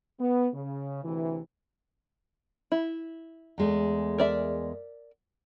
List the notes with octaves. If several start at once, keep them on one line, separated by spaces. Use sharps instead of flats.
B3
C#3
D2 C3 E3
E4
E2 G#3 A3
A#4 D5 E5